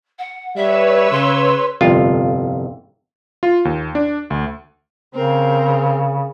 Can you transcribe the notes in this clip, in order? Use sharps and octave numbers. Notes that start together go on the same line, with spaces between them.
F#5
G3 B4 C#5 E5 E6
C#3 C6
G1 C2 F2 F4
F4
D#2
D4
D2
C#3 C4 A#4 C5